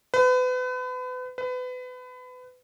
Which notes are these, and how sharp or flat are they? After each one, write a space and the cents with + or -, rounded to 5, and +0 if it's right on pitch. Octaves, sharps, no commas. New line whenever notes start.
B4 +35
B4 +30